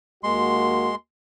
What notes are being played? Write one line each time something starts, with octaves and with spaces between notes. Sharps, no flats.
D#2 G#3 A#3 F#4 C6